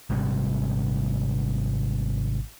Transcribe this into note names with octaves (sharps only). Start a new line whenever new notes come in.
G#1 G#2 C3 G3